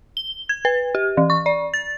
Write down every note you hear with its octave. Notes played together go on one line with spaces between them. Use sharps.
G7
G#6
B4
G4
E3
C#6
D5
A6